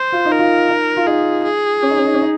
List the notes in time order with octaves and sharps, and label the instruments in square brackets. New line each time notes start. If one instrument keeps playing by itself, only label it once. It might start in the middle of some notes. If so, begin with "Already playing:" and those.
Already playing: [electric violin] C5
[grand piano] F4
D#4
[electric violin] A#4
[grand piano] F4
D#4
F4
[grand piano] D#4 [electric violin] G#4
[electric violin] G#4
[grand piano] C#4
D#4
C#4
D#4
C#4
D#4